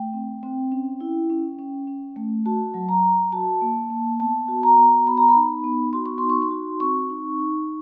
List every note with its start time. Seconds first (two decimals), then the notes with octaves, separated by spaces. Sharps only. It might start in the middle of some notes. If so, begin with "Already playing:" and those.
Already playing: A3 G5
0.13 C4
0.43 C4
0.72 C#4
1.01 E4
1.30 C#4
1.59 C#4
1.87 C#4
2.16 A3
2.46 F#4 A5
2.74 F#3
2.89 A#5
3.04 F#3
3.32 F#4 A5
3.61 A#3
3.90 A#3
4.20 B3 A5
4.48 F#4
4.63 A#5
4.78 B3
5.06 B3 B5
5.17 A#5
5.29 B5
5.35 D#4
5.64 B3
5.93 F#4 C6
6.06 C#6
6.18 D#4 C6
6.30 C#6
6.42 C6
6.51 F#4
6.80 C4 C#6
7.10 D#4
7.39 D#4